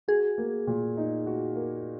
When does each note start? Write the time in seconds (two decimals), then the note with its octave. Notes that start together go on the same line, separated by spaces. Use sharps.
0.08 F#4 G#4
0.38 A#3
0.67 A#2
0.97 D#4
1.26 F#4
1.56 A#3